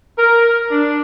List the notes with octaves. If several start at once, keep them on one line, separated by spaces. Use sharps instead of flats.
A#4
D4